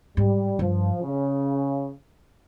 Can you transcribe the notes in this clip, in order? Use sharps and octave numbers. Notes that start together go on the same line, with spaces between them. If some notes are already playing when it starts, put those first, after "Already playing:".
G#2 G3
G2 F3
C#3